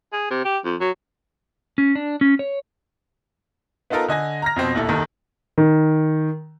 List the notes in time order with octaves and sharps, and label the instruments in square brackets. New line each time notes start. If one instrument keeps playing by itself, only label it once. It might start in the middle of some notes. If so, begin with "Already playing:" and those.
[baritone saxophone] G#4
C3
G4
F2
F#3
[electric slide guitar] C#4
D4
C#4
C#5
[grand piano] B3 D#4 F4 A4 A#4
D3 D#5 G#5 A#6
A#5 F6 A#6
F2 B2 C4
A#1 D#2 E4 A4
F#1 D#2 D#3 A4 A#4
D#3